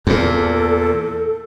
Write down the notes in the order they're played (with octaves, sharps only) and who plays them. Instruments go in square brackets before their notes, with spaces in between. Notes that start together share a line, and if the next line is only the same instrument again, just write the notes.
[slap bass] E2 A#2 [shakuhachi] A4